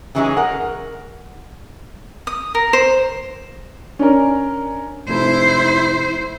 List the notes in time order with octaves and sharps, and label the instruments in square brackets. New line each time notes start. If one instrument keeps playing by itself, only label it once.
[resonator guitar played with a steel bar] C#3 E3 F#3 G#3 D#4 G#4
A#4 F#5
[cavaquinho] D#6
A#4
C5
[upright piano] C#4 D4 A#4
[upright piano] F1 [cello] E4 C5